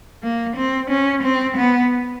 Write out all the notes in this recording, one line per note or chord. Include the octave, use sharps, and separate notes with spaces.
A#3
C4
C#4
C4
B3